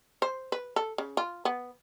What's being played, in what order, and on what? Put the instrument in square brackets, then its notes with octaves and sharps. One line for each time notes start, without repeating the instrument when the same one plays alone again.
[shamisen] C5
B4
A4
C#3
F4
B3